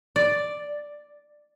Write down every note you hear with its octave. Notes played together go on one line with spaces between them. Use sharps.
D5